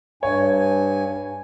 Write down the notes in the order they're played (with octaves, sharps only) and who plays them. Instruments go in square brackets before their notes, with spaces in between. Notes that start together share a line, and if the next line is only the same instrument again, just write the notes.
[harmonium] G2 G#5 [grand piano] C#5